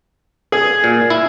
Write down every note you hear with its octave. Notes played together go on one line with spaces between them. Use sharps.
G#4
A#2
E4